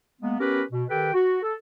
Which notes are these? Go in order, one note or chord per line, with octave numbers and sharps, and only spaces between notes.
G#3 A#3 B3
B3 C#4 G4 A#4 B4
B2
D#3 G4 A4 B4 G5
F#4
A4